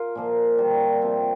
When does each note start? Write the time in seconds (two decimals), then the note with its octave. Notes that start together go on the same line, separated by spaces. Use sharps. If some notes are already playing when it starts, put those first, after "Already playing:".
Already playing: F4 A#4
0.15 A#2 F3 A#3
0.58 G3 A#3 F4
1.02 C3 F3 C4